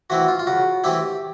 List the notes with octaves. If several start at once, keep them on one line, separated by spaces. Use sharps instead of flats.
E3 A3 C4 E4 F#4
F4
F4
C#3 F#4
E3 A3 C4 E4 G4